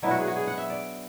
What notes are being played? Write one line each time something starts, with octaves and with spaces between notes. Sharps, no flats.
B2 F#3 B3 D4 E4
F#4
G#4
F#4
G#4
F#5
E5
D5